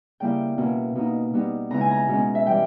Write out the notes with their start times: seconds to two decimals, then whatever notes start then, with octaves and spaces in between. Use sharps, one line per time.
0.20 C#3 G3 A#3 E4 G5
0.57 B2 A#3 C#4 E4
0.95 B2 A#3 D#4
1.33 B2 G3 B3 D#4
1.70 C#3 G#3 B3 E4 A#5
1.81 G#5
1.91 A#5
2.08 B2 G#3 C#4
2.35 E5
2.46 E3 G3 G5